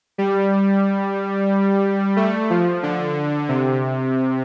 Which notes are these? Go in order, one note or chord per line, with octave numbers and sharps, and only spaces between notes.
G3
A3
F3
D3
C3